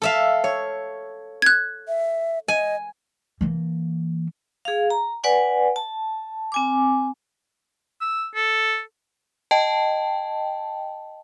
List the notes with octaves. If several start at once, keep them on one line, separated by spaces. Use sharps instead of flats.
A4 E5 F5
C#5
F#6 G#6
E5
D#5 G#5
E3 A#3
G#4 F5
A#5
B4 D5 F#5 G#5
A5
C4 G#5 D6
E6
A4
D#5 G5 A5